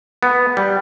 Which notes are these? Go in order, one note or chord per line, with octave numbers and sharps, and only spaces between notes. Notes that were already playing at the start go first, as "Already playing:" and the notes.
B3
G3